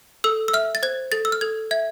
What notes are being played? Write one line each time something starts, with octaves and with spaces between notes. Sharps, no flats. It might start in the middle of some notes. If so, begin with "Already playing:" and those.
A4 E6
E6
E5 F6
A6
C5 G#6
A4 A6
E6
F6
A4 G#6
E5 G#6